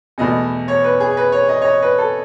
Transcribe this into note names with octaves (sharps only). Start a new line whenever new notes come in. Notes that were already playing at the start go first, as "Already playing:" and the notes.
E2 B2 A3 D#5
C#5
B4
G#4
B4
C#5
D#5
C#5
D#5
B4
A4